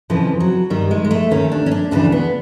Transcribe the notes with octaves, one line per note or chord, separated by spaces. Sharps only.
F2 C#3 E3 F3
F#3
G2 D#3 G3
G#3
G#3
A3
D#2 D#3 C#4
D4
C#4
D4
D2 C#3 E3 D4
B3